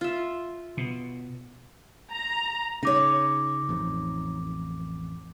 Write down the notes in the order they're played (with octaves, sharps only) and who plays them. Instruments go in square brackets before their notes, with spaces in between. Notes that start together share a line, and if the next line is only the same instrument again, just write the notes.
[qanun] F4 E5
[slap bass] B2
[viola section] A#5
[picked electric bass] C#3 [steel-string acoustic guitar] D#4 C#5 [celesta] D6 A#6
[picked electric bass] A1 F2